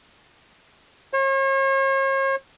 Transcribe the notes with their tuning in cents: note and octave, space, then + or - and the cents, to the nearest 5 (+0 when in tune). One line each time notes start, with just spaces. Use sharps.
C#5 -40